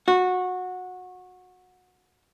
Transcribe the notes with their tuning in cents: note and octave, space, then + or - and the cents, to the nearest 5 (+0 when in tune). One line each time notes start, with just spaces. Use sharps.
F#4 -20